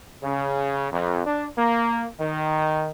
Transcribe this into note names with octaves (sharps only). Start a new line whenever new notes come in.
C#3
F2
D4
A#3
D#3